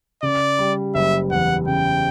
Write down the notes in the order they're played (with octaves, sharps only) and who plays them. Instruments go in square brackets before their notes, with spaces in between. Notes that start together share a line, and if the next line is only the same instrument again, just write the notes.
[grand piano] C#3 [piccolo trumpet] D5
[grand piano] G3
[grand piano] F#1 [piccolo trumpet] E5
[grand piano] E2 [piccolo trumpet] F#5
[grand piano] C#3 [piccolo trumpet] G5